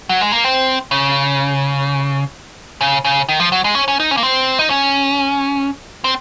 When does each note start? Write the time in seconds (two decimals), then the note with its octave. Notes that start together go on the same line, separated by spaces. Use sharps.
0.09 F#3
0.21 G#3
0.32 A#3
0.44 C4
0.91 C#3
2.81 C#3
3.05 C#3
3.29 D#3
3.40 F3
3.52 F#3
3.64 G#3
3.75 C#4
3.88 C#4
4.00 D#4
4.11 C#4
4.17 A#3
4.23 C4
4.59 D#4
4.70 C#4
6.04 C4